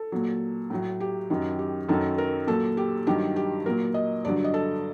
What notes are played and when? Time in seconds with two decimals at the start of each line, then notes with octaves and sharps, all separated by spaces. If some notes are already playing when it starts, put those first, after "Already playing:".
Already playing: A4
0.12 A#2 F#3
0.70 A2 F#3
1.00 G4
1.30 F#2 D#3 F#3
1.59 G4
1.89 F#2 D#3 F#3 A4
2.18 A#4
2.47 A#2 F#3 A4
2.77 G4
3.07 G2 D#3 F#3 G4
3.36 G4
3.66 A#2 F#3 A#4
3.94 D#5
4.25 G2 D3 F#3 D5
4.44 D#5
4.54 A4